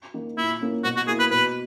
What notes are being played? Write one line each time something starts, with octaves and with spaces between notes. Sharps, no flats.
D#3 A#3 D#4
A#2 E4
A#3 C#4 E4
B2 F#4
F#4
A#3 E4 G#4
B4
B2 B4